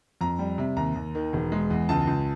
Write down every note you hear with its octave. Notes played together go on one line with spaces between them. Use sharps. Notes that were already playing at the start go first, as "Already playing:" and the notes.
F2 A#5
G3
C3
D#2 A#5
D#2
D#3
E1
G#3
E2
C#2 A5
C#2